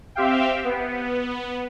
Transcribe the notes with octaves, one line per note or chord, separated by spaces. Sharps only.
C4 G4 E5 F5 G5
B3